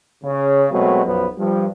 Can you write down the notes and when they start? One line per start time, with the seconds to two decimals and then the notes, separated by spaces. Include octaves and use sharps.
0.23 C#3
0.71 B2 F#3 G#3 A3 C4
1.05 B1 F#2 F3 B3
1.38 G2 F3